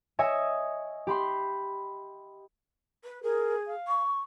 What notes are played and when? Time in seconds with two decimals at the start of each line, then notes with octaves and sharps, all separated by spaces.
0.19 C#5 D#5 E5 G#5
1.07 G4 B5 C6
3.04 B4
3.23 G#4 A#4
3.67 F5
3.88 C#6